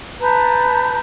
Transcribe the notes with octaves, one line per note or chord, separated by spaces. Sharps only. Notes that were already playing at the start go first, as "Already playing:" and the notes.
B4 A5 A#5 G6